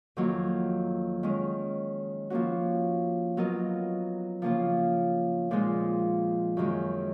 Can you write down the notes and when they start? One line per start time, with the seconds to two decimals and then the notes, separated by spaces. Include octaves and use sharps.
0.17 F2 D#3 F#3 A#3
1.23 D#3 G#3 C#4
2.30 F3 A#3 C#4 F#4
3.37 F#3 B3 F4 A#4 D#5
4.42 C#3 F3 A#3 F4
5.51 A#2 F3 G#3 D#4
6.57 F#2 D#3 G#3 C#4